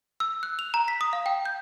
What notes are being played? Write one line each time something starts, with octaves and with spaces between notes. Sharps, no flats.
E6
F#6
F7
A#5
B6
D#6
F5
G5
G6